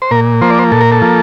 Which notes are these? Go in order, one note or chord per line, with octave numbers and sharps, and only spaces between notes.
C5
A#2 A#4
F3 A#3 C5
D5
C5
A#2 A4
A#4
A4
F3 A#3